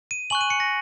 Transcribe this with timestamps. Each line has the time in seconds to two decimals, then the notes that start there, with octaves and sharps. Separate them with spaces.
0.11 D#7
0.30 G#5 C#6 F#6 F#7
0.41 D#7
0.50 C#7
0.60 A#6